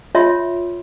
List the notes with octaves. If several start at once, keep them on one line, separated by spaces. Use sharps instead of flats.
F4 C#5 E5 C6